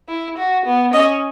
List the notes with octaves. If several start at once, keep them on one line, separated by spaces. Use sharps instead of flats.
E4
F#4
B3
C#4 D#5